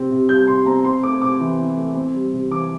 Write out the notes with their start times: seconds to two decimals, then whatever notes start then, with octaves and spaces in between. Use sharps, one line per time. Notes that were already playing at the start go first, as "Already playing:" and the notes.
Already playing: C3 C4
0.11 C3
0.29 G3 G6
0.47 C3 C6
0.66 C4 A#5
0.85 C4 C6
1.03 A3 D6
1.22 C3 D6
1.40 E3
1.59 C4
1.77 A3
1.96 C4
2.14 G3
2.33 C3
2.51 E3 D6